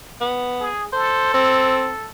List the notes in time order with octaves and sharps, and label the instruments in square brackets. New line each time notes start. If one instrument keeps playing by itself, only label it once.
[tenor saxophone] B3
[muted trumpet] G#4
[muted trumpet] A4 [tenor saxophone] C5
[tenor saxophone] C4